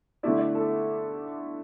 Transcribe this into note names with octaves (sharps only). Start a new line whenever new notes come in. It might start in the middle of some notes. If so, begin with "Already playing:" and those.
D3 A3 E4 D5
D5
A4